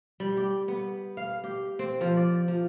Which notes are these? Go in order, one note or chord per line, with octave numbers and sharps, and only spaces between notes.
G3
G4
B3
F5
G4
C4
F3
D5
F3